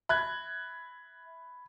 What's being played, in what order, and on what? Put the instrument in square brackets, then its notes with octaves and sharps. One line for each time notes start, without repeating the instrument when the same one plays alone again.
[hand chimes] E5 [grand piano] B5 F#6 G#6